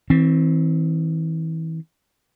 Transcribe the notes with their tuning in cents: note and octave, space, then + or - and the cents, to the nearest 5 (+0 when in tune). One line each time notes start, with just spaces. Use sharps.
E3 -35 C4 +5